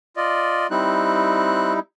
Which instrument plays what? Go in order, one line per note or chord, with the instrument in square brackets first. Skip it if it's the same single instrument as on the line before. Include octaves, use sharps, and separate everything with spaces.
[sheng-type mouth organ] F4 D5 D#5
[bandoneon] G3 D#4 E4 [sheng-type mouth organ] C4 F#6